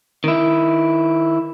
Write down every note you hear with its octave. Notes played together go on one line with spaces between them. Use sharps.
D#3 E4